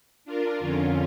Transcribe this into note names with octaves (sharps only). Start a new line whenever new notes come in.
D4 F4 A#4
F2 D3 C#4 F4